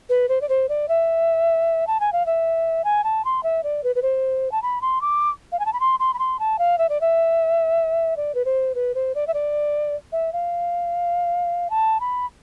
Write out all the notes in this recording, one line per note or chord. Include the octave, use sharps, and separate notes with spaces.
B4
C5
D5
C5
D5
E5
A5
G#5
F5
E5
G#5
A5
C6
E5
D5
B4
B4
C5
A5
B5
C6
D6
F5
G#5
A5
B5
C6
C6
B5
C6
A5
F5
E5
D5
E5
D5
B4
C5
B4
C5
D5
E5
D5
E5
F5
A5
B5